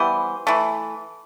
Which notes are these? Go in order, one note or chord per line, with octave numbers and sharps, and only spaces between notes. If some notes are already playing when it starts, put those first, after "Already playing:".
Already playing: E3 G3 B3 C5
E3 A3